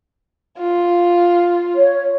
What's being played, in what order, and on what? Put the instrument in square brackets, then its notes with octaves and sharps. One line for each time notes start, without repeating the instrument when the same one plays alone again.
[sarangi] F4
[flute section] C#5